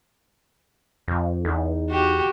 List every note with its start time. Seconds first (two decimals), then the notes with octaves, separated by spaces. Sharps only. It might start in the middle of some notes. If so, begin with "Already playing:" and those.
1.08 F2
1.45 E2 D#4
1.90 F#4 G4